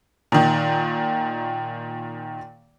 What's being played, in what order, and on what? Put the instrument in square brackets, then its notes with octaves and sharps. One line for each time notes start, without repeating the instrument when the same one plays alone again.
[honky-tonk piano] A#2 D#3